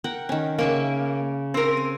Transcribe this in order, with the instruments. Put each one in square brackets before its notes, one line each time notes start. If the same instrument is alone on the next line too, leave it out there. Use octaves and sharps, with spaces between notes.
[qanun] A#4 F#5 G5
D#3 C#4
[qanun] C#3 C#4 E5 [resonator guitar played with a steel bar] A#3
[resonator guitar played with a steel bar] C4 A#4
[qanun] G#5